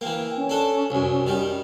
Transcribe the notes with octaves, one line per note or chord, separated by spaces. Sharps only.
E3 A#3 G5
C#4
D4 A4
C2 F#2
D#3 G3